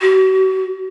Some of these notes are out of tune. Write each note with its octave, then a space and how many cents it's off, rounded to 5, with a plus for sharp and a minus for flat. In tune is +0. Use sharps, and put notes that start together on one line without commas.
F#4 +40